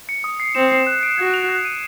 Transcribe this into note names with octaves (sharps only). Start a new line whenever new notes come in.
C#7
D#6
C7
C4 E7
C7
F#6
D7
F#4 G#6
F7
F#6
D#7